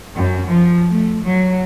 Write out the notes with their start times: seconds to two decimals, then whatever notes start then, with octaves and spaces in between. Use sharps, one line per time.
0.15 F#2
0.49 F3
0.90 A3
1.24 F#3